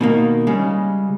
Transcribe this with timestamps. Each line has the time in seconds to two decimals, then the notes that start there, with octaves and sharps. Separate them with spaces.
0.01 B2 D#3 A#3
0.47 C#3 G3 G#3